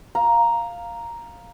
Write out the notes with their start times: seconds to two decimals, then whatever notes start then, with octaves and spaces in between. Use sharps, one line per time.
0.15 F5 A#5